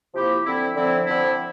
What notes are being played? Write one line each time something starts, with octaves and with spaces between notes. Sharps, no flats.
C3 F3 A#3 E4 G4
D3 F3 C4 E4
D3 F3 C4 E4
D3 F3 C4 E4